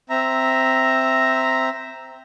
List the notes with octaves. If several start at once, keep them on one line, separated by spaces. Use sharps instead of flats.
C4 E5 A#5